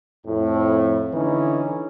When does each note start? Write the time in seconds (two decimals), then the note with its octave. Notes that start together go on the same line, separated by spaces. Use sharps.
0.26 F2 A2
1.14 D3 E3 C#4 D#4